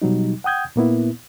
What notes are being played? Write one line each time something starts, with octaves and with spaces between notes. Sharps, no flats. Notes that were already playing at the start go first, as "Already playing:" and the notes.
B2 F#3 G3 D#4
F#5 G5 D#6 G6 G#6
A#2 A#3 B3 E4